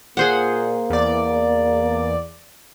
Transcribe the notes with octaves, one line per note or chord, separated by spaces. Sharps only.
A#2 A#3 G#4 C5 F#5
E2 D5